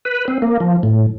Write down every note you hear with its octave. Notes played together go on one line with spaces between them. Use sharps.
B4
C4
A#3
F3
A2